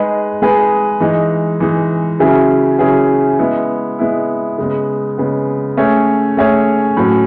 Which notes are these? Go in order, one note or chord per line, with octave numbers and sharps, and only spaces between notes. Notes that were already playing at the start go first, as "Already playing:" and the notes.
Already playing: G#3 D#4 G#4 B4
G#3 D#4 G#4 B4
E3 G#3 D#4
E3 G#3 D#4
C#3 F#3 C#4 E4 G#4
C#3 F#3 C#4 E4 G#4
G#3 B3 E4
G#3 B3 E4
C#3 G#3 B3
C#3 G#3 B3
A3 C#4 G#4 C#5
A3 C#4 G#4 C#5
A2 F#3 C#4